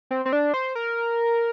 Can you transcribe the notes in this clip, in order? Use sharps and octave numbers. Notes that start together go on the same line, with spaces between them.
C4
C4
D4
C5
A#4